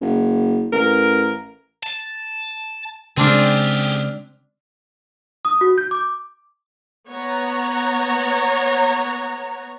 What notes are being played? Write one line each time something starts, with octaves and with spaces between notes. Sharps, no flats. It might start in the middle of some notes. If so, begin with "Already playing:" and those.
F#1
A1 A#4
A5
C#3 G#3 C4 D4 F4 G4 G#4
D#6
F#4
G6
D6
B3 C#5 A#5